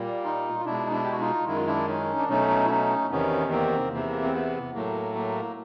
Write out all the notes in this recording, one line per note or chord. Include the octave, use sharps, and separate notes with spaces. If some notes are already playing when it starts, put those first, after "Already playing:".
Already playing: A#2 G3 A#3
D#4 F4
F4
B2 G#3 D4 E4
D#4
D4 E4
G4
F#4
D#4 F4
F#2 D#3 G#3 E4
F4
D4 E4
C#4 D#4
D4
B2 F#3 A3 C#4 D#4
E4
C#4 D#4
E2 C3 D#3 B3 C#4
A#3 C4
E2 C3 E3 A#3
C4
B3
A2 F#3 A3 A#3
A#3